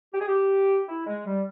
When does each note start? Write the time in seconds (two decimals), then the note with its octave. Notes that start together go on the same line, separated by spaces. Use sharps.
0.13 G4
0.20 G#4
0.27 G4
0.88 E4
1.07 G#3
1.25 G3